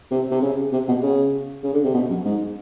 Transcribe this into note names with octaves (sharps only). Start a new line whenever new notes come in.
C3
C3
C#3
C3
B2
C#3
C#3
D3
C3
B2
F#2
G#2